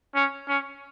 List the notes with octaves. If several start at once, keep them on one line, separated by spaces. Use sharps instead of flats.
C#4
C#4